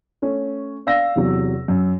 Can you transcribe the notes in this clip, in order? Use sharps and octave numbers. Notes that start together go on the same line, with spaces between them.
A3 C#4
D5 F5 E6 A#6
E2 C3 F#3
F#2